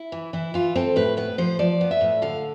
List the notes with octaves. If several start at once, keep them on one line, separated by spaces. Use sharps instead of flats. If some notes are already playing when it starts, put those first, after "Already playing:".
Already playing: E4
E3
E3 E4
E3 F4
C4 A4
A2 B4
B3 B4
F3 C5
F3 D5
B3
E5
A2
D3 F5